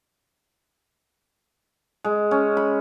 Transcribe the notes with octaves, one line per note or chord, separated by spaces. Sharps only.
G#3
C#4
B5